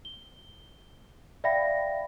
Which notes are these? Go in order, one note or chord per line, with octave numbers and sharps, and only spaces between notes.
G7
D5 E5 F5 G5 B5 A#6